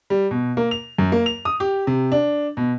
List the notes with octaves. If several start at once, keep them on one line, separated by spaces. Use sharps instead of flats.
G3
B2
A#3
F7
F#2
A#3
F7
D#6
G4
C3
D4
B2